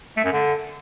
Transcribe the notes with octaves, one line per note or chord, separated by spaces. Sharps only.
A3
F#2
D3